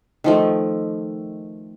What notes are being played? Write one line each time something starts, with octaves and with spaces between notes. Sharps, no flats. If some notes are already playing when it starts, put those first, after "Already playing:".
D#3 F3 A3